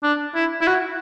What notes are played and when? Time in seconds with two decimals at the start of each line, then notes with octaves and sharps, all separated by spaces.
0.03 D4
0.35 E4
0.61 E4
0.67 F#4